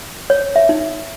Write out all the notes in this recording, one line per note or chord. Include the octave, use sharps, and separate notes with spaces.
C#5
E5
D#4